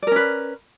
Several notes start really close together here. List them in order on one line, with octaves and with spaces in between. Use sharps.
D5 A#4 C#4 B4